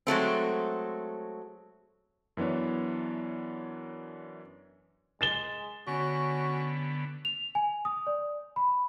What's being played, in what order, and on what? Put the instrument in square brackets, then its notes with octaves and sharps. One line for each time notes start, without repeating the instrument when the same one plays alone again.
[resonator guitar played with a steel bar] F#3 G#3 A3 C4
[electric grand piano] F#2 E3 B3 D4 C#5
[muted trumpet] G#3 [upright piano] A6 E7 G7
[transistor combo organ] D3 B3 [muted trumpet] C#4 [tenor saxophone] F#4
[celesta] F7
G#5
D#6
D5
B5